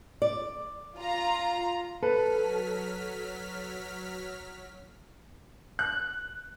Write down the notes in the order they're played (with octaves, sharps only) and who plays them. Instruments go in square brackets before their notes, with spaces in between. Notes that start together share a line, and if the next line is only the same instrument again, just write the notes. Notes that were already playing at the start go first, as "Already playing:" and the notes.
[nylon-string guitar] D5
[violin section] F4 A#5
[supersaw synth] F#3 F6 B6 [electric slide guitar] A4 [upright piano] B4
[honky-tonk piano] F#6